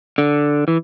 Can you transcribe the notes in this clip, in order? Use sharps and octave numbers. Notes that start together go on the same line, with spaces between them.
D3
E3